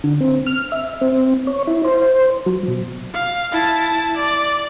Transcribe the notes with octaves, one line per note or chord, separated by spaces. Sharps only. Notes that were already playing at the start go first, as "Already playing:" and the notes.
D3
C4
F6
E5
C4
C#5
E4
C5
F#3
B2
F5
E4 A5
D5